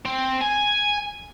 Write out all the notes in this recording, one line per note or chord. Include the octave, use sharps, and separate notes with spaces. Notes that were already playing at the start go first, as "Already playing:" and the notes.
C4
G#5